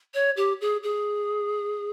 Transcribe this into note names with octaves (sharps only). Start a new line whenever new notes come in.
C#5
G4
G#4
G#4